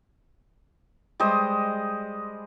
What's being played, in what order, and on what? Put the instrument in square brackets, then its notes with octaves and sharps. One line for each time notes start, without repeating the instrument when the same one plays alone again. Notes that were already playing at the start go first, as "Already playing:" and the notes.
[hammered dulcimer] G3 G#3 C5 D#5